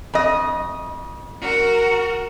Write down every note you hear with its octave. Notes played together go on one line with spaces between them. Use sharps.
F2 D#5
F#4 A#4